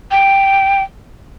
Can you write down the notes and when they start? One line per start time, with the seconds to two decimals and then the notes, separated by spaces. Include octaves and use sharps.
0.11 G5